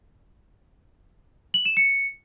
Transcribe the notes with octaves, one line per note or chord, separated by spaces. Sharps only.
F#7
E7
C#7